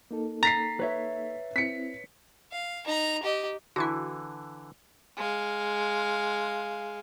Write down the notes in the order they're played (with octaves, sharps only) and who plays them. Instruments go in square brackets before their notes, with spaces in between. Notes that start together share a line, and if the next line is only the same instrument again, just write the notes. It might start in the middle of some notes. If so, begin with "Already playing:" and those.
[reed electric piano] A#3 D#4 A4
[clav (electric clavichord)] A#5 [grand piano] A6 B6 C7
[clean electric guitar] B4 C#5 E5
[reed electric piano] C4 E4 [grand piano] B6 C#7
[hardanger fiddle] F5
D#4 A#5
G4 D#5
[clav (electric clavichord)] D3 E3 [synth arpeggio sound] E4 F#4
[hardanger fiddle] G#3 F5